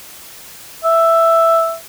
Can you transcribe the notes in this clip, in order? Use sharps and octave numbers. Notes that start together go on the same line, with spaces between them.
E5